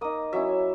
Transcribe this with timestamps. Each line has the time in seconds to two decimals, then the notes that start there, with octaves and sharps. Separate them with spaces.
0.01 A#3 D#4 D#6
0.33 F#3 C#4 E4 E5